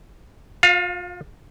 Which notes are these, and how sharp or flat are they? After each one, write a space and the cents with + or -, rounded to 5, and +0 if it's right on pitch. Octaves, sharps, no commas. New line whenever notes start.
F4 +35 F5 +0